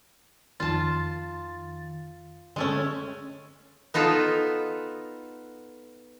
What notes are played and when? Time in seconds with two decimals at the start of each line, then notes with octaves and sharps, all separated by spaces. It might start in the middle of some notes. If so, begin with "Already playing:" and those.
0.60 F2 D#3 F4 A5 A6
2.56 D3 G#3 A3 C#4
3.94 B3 D#4 F4 A4 B4